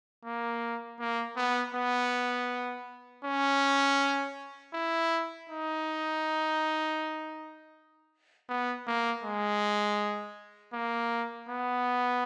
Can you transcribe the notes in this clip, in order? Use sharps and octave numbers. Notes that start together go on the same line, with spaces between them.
A#3
A#3
B3
B3
C#4
E4
D#4
B3
A#3
G#3
A#3
B3